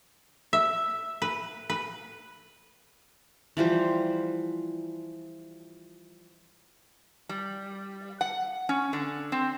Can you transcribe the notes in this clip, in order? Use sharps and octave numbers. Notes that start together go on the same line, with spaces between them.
E5
B4
B4
E3 F3 G3 C5
G3
F#5
C#4
D3
C4